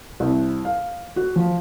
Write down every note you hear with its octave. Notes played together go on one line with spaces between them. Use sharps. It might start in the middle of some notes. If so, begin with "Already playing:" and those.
C2
F5
F#4
F3